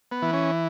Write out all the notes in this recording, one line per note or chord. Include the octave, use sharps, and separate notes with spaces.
B3
E3
C#4